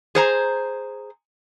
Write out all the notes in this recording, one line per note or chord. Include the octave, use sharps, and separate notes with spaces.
G#4 C5 A#5